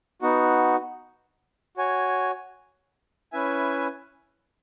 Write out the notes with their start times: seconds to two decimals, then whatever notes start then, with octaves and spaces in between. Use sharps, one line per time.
0.22 B3 D#4 F#4
1.77 F#4 C#5 G#5
3.32 C#4 E4 B4 E5 G#5